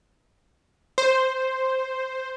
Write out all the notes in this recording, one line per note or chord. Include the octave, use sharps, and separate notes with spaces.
C5